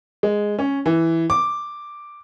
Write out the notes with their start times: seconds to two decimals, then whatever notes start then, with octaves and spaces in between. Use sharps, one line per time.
0.23 G#3
0.59 C#4
0.86 E3
1.30 D6